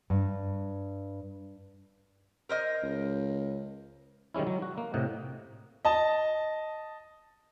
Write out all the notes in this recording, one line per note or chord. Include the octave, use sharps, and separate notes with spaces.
G2
A#4 C5 D#5
C#2
D#3 G3 G#3 C#4 E4
F#3
F#4
A#3
A2 C3 D#5 F#5
D#5 A5